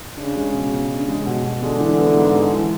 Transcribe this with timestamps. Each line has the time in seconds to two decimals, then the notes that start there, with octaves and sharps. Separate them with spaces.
0.17 C#3 D4
0.36 G#3
0.54 B2
0.72 B2
0.90 D4
1.08 G#3
1.26 B2
1.44 B2
1.63 D3 G#3
1.80 E3
1.98 B3
2.17 G#2
2.34 G#3
2.53 E3